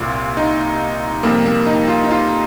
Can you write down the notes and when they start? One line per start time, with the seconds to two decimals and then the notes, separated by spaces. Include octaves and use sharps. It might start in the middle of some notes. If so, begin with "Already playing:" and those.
Already playing: C2 A#2 G3 F4
0.37 D#4
1.23 F2 C3 G3 A#3
1.46 A#3
1.66 D#4
1.88 F4
2.04 D#4
2.10 F4